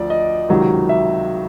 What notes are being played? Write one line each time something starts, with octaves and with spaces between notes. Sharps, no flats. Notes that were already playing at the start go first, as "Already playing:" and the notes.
Already playing: D2 F3 D5
D#5
C#2 C3 D#3 F#3
E5